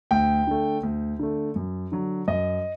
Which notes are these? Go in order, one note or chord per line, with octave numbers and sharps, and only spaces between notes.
D2 G5
D3 A3
D2
D3 A3
F#2
D3 F#3
F#2 D#5